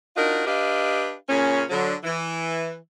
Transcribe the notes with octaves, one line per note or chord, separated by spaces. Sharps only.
D4 D#4 F4 F#4 A#4
D4 G4 B4 D#5 F5
A#2 C#3 C#4
D3 F#3
E3